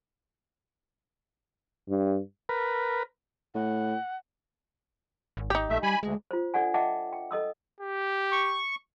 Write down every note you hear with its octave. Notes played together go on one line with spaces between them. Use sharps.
G2
A#4 B4
A2 F#5
G#1
D#4 G4
A#1 A3 E5
G3 G#5 B5
D2 G#3
F4 C5
D4 A4 D5 F#5 G#5
D#5 E5 F#5 G5 A5 D6
G5
A4 D#5 D#6 E6
G4
C#6